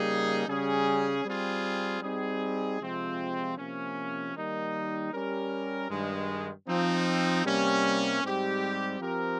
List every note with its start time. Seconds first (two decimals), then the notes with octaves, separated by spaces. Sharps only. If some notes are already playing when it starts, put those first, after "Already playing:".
Already playing: C#3 G3 A#3 D#4 G#4
0.47 C#3 G3 C#4 G#4
1.24 G3 C4 F4 G#4
2.02 G3 C4 D#4 G#4
2.80 C3 F3 G#3 C4 F4
3.57 C3 F3 A#3 C#4
4.35 D#3 G3 A#3 D#4
5.12 G3 C#4 G4 A#4
5.90 G2 D#3 G#3
6.68 F3 C4 D#4
7.46 C3 G3 A#3 C#4
8.23 G#2 G3 C4 G4
9.00 F3 C4 G4 A#4